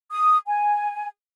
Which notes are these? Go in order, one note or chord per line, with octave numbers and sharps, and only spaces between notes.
D#6
G#5